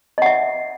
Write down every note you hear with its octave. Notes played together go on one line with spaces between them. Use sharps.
D#5 E5 F#5